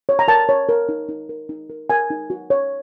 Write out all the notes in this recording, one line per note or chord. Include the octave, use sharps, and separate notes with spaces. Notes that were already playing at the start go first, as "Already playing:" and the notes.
C#5
A#5
A#4 A5
C#5
A#4
D#4
D#4
A#4
D#4
A#4
A#4 G#5
D#4
F#4
C#5